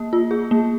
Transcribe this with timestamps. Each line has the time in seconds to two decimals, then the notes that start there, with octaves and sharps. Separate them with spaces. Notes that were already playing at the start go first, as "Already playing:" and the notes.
Already playing: A#3
0.13 F4
0.31 G#4
0.51 A#3